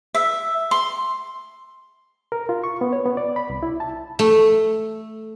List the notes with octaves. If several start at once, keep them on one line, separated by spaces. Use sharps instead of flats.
E5
C6
A#4
F4
C#6
B3
C#5
B3
D5
B5
C2
E4
A5
A3